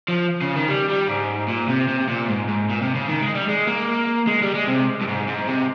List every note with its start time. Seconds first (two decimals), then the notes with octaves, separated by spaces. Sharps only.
0.08 F3
0.41 C#3
0.56 D#3
0.68 G3
0.89 G3
1.08 G#2
1.48 A#2
1.68 C3
1.88 C3
2.08 A#2
2.28 G#2
2.48 G#2
2.70 A#2
2.82 C3
2.95 C#3
3.08 D#3
3.21 G#3
3.35 G3
3.49 G#3
3.68 A#3
4.27 G#3
4.42 G3
4.55 G#3
4.67 C3
5.01 G2
5.08 G#2
5.28 G#2
5.48 C3